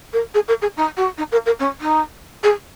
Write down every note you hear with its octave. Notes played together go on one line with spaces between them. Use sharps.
A#4
G#4
A#4
G#4
D#4
F#4
D#4
A#4
A#4
C#4
D#4
G#4